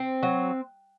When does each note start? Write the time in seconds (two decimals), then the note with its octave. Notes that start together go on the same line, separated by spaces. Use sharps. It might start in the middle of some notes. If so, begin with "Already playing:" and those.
Already playing: C4
0.23 F#3